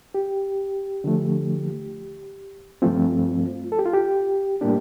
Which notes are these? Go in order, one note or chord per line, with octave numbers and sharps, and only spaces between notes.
G4
D3 F3 A3
G2 F3 A3 C4 F4
A4
G4
F4
G4
A2 G3 A#3 D4 G4